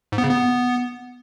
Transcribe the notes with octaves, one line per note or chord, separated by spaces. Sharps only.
G#2
B3
C#3
B3